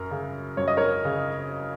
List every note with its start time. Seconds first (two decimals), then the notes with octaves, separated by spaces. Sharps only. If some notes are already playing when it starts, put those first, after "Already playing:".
Already playing: F#2 A#4
0.11 C#3
0.57 F#2 C#5
0.68 D#5
0.77 A#4 C#5
1.05 C#3